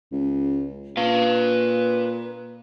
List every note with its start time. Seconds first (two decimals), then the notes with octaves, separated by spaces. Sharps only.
0.12 C#2
0.97 A#2 B4 F5